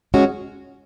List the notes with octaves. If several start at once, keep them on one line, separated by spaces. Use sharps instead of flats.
G#3 C#4 F#4